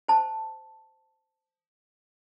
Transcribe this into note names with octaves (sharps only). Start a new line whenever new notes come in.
C5 A5